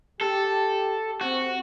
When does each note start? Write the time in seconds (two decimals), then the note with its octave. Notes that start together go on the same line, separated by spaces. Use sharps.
0.21 G4 A4
1.21 C4 F#4